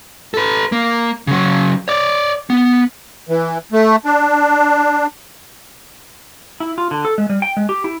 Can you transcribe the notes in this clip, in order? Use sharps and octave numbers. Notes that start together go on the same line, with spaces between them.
A4 B4
A#3
C#3 F#3
C#5 D5
B3
E3
A3
D4
E4
F4
D3
A4
G#3
G3
G5
G#3
G4
E4